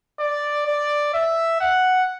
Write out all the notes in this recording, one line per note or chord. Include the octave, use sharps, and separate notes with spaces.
D5
D5
E5
F#5